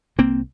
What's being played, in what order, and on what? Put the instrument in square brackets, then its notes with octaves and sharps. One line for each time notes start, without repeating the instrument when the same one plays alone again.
[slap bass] C2 A#3 C4